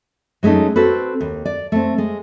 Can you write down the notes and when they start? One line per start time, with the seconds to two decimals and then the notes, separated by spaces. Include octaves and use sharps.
0.43 F#3 G#3 A3 C#4 D#4
0.76 C4 F#4 A4 B4
1.21 D#2
1.45 D5
1.72 A3 C4
1.98 G#3